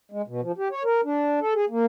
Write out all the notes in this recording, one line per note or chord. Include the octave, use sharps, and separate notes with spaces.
G#3
B2
F3
G4
C#5
A#4
D4
A4
G#4
A#3